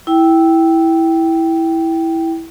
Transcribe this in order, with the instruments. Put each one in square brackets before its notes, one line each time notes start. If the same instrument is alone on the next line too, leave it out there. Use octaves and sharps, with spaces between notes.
[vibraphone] E4 G5